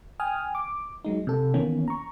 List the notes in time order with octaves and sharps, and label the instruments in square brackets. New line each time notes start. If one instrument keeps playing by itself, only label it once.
[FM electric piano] G5 G#5 D#6 F6
D6
F#3 G#3 D#4
C3 A4
D#3 E3 A#3 B3 C#4
A#5 C#6